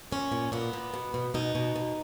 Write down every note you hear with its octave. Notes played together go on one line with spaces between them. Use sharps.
A#2 C#4
A#2
A#2 B3
A#2
B2
B2
B2 D#4
B2
B2